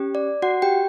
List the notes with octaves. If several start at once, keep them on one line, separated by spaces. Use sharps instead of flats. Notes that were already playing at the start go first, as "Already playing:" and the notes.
Already playing: C#4 G4
D5
F#4 F#5
G4 G5